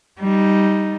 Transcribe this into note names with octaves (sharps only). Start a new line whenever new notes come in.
G3 D#4